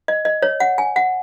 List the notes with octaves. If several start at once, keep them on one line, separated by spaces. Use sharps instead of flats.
D#5
D#5
C#5
F#5
G#5
F#5